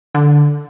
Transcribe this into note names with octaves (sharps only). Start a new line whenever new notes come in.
D3